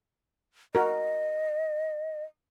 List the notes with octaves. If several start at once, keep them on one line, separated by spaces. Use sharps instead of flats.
F#4 A#4 D#5